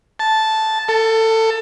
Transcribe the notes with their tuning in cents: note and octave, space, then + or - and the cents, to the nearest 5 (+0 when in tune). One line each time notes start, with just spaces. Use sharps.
A5 -5
A4 +25